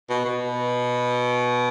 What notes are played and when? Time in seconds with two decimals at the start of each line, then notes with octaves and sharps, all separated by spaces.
0.09 B2
0.25 B2